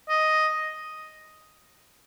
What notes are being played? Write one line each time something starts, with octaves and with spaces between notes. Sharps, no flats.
D#5